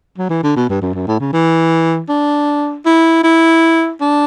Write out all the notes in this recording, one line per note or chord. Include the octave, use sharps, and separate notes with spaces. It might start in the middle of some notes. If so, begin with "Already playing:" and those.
F#3
E3
D3
B2
G2
F#2
F#2
A2
C#3
E3
D4
E4
E4
D4